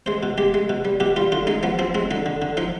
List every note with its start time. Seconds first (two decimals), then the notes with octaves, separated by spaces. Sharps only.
0.06 G#3 C5
0.23 B2
0.38 G#3 G4
0.54 G#3
0.69 B2
0.85 G3
1.00 B2 G4
1.16 G3 F4
1.32 D3 F4
1.47 G#3 D#4
1.63 F3 B3
1.79 F3 C4
1.95 G#3 C4
2.11 D3 D#4
2.26 D3
2.42 D3
2.57 F3 D#4